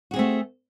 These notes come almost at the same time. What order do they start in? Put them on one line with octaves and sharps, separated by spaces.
F#4 G#4 C4 A3